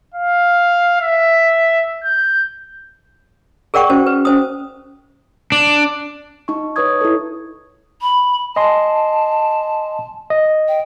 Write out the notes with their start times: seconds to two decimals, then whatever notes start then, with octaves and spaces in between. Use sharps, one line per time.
0.14 F5
1.01 E5
2.04 G6
3.74 G#4 A#4 D5 F#5 G5 C#6
3.90 C#4 F#4 C5
4.06 B4
4.25 C#4 C5 D#6
5.52 D4
6.48 D#4 C#6
6.76 D#4 B4 C#5 C#6 D#6 G#6
7.01 E4 A4
8.02 B5
8.56 D#5 G#5 A5 C6
10.30 D#5
10.68 G5